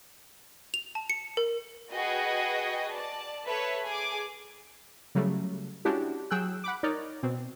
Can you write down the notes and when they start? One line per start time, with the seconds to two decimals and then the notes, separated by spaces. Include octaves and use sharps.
0.74 F7
0.95 A5
1.10 C#7
1.37 A#4
1.92 F#4 G#4 B4 D#5 G5
2.91 D5 A5
3.46 A4 B4 C#5 E5 A5
3.86 G#4 D6
5.15 C#3 F#3 G3 A3
5.85 G#3 C#4 D4 E4 F#4 G4
6.31 F#3 G#4 G5 E6 F#6
6.64 F#5 B5 D6
6.83 D#4 A#4 C#5 D5
7.23 B2 C4